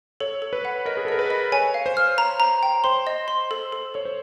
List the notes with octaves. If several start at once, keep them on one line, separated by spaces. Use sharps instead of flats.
A4 C#5
A4
B4
F#5
A#4 D#5
G#4
A4
A#4 D#5
B4
D#5
C#5 G#5
F5
C5
F6
C5 A#5
A#5
G5
C5 C6
D#5
C6
A4
A4
A4 C#5
C5